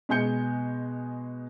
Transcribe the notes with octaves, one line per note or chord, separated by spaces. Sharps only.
B2 G#3 G#5 G6 C#7